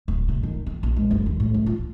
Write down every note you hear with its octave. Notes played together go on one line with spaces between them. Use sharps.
D1
C3
D#3
C4
A#1
G#3
F#1
D#2
A2
C#2
F4